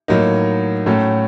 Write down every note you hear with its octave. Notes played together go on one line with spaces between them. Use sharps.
A2 F#3 A#3 D#4
A2 F#3 A3 C#4